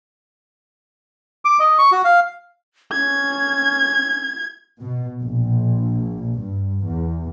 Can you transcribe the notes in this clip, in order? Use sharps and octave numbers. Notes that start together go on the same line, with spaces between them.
D6
D#5
C#6
F#4
F5
C#4 G#6
B2
A#1
G2
E2